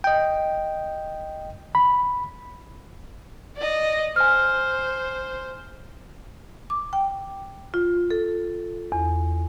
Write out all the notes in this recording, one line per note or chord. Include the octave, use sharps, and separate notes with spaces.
D#5 G5
B5
D5 D#5
C5 G#5 F6
D6
G5
F4
A4
E2